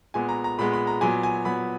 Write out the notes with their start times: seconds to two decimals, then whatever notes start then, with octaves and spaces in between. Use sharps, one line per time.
0.14 A#2 G#3 B3 G#5
0.29 A#5
0.44 A#5
0.59 A#2 G#3 B3 B5
0.73 B5
0.87 A#5
1.01 A#2 F#3 B3 G#5
1.23 G#5
1.45 A#2 F#3 B3 B5